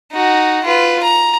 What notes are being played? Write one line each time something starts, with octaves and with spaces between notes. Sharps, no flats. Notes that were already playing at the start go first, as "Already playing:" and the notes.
D#4 F#4
F4 B4
A#5